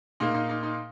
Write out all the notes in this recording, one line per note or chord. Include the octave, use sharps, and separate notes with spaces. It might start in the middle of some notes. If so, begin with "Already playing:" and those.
A#2 A#3 D#4
D#4
D#4
D#4